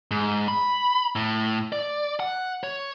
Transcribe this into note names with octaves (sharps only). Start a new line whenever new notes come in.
G#2
B5
A2
D5
F#5
C#5